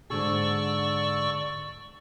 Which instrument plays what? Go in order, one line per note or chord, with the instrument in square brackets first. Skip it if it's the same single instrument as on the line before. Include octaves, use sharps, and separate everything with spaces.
[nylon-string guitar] G#2 D3 G#4 [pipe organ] D5 C#6 E6